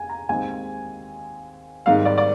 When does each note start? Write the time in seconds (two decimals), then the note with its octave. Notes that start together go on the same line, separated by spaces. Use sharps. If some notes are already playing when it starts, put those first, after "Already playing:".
Already playing: F1 G#5
0.09 A#5
0.29 D#2 D#3 G#3 C4 G#5
1.86 G#1 G#2 D#3 G3 A#3 F5
2.05 D5
2.18 D5